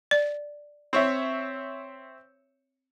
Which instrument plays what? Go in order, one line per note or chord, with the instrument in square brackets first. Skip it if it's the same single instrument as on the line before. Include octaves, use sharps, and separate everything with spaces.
[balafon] D5
[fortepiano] C4 C#5 E5